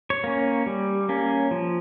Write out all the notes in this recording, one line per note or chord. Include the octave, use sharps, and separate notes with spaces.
C#5
A#3 C#4
G3
A#3 C#4
F3